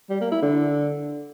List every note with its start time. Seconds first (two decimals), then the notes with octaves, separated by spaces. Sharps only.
0.10 G3
0.21 A#3
0.32 E4
0.42 D3